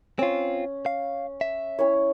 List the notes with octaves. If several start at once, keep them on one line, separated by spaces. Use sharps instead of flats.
C4 C#4 F4
F5
E5
C#4 E4 C#5